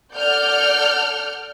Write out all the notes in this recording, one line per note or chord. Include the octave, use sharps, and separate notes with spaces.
A4 D5 F#5 F6 G6